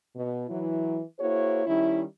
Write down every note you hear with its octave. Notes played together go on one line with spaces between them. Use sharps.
B2
E3 F#3 E4
A#3 E4 F#4 G#4 C5 C#5
D#3 G3 C#4 E4